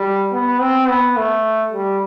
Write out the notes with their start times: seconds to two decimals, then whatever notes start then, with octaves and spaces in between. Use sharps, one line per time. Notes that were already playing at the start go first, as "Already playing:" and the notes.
Already playing: G3
0.32 B3
0.61 C4
0.89 B3
1.17 A3
1.73 G3